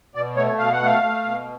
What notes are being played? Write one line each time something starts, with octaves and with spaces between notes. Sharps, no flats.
B2 D5
A3 C#5
B2 F5
F#5
A3 F5
A3
B2